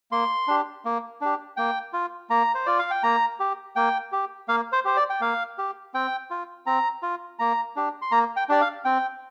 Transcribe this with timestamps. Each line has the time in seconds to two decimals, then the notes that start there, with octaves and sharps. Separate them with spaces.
0.11 A#3 C6
0.48 D4 G4
0.85 A#3
1.21 D4 G4
1.57 A#3 G5
1.93 F4
2.30 A#3 A#5
2.55 C5
2.66 F4 D5
2.79 F5
2.91 G5
3.03 A#3 A#5
3.40 G4
3.76 A#3 G5
4.12 G4
4.48 A#3 F5
4.72 C5
4.85 G4 C5
4.96 D5
5.10 G5
5.21 A#3 F5
5.58 G4
5.94 C4 G5
6.31 F4
6.66 C4 A#5
7.02 F4
7.39 A#3 A#5
7.76 D4 G4
8.02 C6
8.12 A#3 A#5
8.36 G5
8.49 D4 G4 D5
8.61 F5
8.85 C4 G5